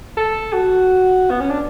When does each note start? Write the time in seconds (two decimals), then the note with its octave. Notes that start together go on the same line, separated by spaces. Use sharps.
0.17 A4
0.53 F#4
1.30 B3
1.40 C#4
1.50 D4